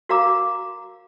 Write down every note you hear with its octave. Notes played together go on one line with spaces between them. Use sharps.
F#4 A#4 F5 A#5 D6